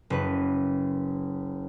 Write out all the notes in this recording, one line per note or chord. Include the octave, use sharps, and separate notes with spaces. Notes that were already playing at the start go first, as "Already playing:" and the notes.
F#1 B4